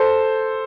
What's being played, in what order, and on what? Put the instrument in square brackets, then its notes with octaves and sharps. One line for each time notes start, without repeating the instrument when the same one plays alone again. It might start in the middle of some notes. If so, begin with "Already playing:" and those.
Already playing: [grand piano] A4 C5